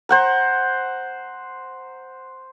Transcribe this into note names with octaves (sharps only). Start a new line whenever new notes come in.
C5 F#5 A#5